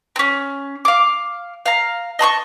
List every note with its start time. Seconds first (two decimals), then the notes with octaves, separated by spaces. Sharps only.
0.16 C4 C#4
0.85 F5 D6
1.66 F5 A#5
2.19 D#5 A5 C6 C#6